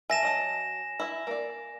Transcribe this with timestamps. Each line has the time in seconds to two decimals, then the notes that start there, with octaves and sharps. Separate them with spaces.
0.10 E5 G#5 A5 A#6 E7
0.23 F#3 D#5 A5
1.00 E4 E5
1.27 A#3 D5